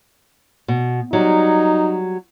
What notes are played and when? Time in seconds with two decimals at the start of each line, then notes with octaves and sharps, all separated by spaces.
0.68 B2
1.13 F#3 G3 D#4